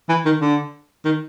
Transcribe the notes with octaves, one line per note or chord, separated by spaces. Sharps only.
E3
D#3
D3
D#3